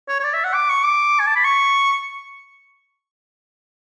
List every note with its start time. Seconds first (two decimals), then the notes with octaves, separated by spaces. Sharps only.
0.08 C#5
0.20 C#5
0.24 D5
0.34 E5
0.44 F#5
0.54 D6
0.69 C#6
0.84 D6
1.19 G#5
1.27 A5
1.35 B5
1.44 C#6